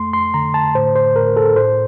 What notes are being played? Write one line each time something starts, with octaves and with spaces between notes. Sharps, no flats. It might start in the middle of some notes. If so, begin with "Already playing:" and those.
Already playing: F2 A3 C6
C6
D3 A#5
A5
A2 C5
C5
A2 A#4
A4
A2 C5